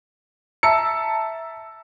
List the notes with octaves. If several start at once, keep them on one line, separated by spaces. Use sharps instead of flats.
E5 A5 A#5 E6 C#7